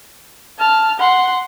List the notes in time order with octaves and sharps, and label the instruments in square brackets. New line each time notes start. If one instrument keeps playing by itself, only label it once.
[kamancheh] A5 F6
F#5 C6